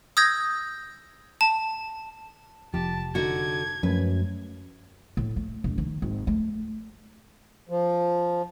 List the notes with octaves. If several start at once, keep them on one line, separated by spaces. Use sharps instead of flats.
D#6 E6 G6 G#6 A#6
A5
F1 F3 G4 A5
D3 D#4 F#4 G#6
F#2 F3 G#3 A3 B4
A2
A3
E1
D#3
G#1
A3
F3